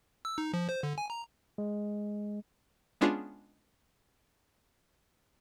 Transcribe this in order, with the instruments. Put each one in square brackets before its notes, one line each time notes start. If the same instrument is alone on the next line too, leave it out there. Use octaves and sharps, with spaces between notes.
[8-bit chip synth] E6
D#4
F3
C5
D3
G#5
A#5
[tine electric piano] G#3
[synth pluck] G#3 B3 C#4 D4 F4 G#4